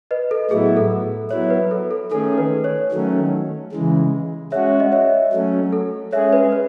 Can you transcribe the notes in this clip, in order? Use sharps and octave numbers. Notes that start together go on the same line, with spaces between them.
B4 D#5
A4
A2 F#3 B3 E4 G#4
A4
F#3 B3 E4 C#5
B4
A4
A4
D#3 A3 C#4 G#4 A4
B4
C#5
D#3 F#3 A3 C#4
C#3 E3 G#3
G#3 C#4 F#4 C#5 E5
D#5
C#5 E5
F#3 A3 C#4
A4
G#3 C#4 G#4 C#5 E5
B4
B4